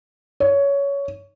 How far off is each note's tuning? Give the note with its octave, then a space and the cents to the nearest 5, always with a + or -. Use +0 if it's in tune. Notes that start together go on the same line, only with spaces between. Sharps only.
C#5 +15